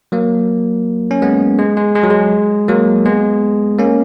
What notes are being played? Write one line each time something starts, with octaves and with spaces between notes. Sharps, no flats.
F#3 A#3
C#4
G#3 B3
G#3
G#3
G#3
F#3
G#3
F#3 A#3
G#3 B3
A#3 C#4